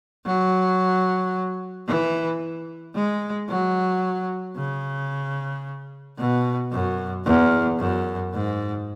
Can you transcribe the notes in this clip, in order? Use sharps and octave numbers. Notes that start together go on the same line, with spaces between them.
F#3
E3
G#3
F#3
C#3
B2
F#2
E2
F#2
G#2